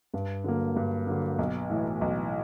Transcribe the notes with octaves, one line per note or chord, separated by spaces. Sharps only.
G2
D3 F#3 A#3
G2
D3 F#3 A#3
B1
A2 E3
B1